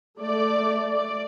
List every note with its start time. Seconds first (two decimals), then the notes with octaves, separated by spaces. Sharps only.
0.17 A3 D5
0.92 D5